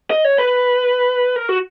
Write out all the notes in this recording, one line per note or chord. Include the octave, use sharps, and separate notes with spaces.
D#5
C#5
B4
A#4
F#4